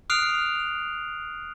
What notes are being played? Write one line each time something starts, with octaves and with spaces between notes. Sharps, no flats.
D#6 F6 F#6 C7 D7 F7